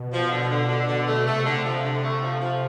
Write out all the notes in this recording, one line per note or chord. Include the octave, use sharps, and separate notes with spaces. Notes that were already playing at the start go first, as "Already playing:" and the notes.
Already playing: B2
F3
D3
D3
D3
D3
A3
C3 A3
D3
F3
D3
A3
F3
F3